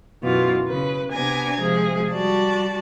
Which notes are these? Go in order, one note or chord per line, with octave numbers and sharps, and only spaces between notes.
F#2 B2 E3 F4
C#3 B4
C3 B3 D4 G#5 A#5 G#6
C3 F3 G#3 G#4
G3 F#4 D5 A5